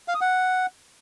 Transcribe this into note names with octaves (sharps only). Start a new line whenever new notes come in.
F5
D#6
F#5